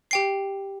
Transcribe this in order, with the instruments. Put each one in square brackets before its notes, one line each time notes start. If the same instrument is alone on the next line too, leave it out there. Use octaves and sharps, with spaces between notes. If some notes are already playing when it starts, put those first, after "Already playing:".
[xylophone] G4 G5 C7